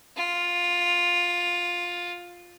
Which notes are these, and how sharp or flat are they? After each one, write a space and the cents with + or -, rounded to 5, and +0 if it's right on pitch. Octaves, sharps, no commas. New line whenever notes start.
F4 +10